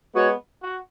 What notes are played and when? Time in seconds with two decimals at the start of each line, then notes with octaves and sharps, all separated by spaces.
0.13 G#3 B3 F#4 C#5
0.60 F#4